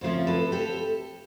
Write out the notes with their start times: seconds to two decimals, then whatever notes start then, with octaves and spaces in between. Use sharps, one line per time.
0.01 F2 C#3 F3 A3 C#4
0.27 A4 B4
0.52 G4 A4